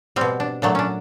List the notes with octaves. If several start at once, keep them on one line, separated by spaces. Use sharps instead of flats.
B2 G3 C4
D4
A#2 F#3 A3 D4
C#4 D4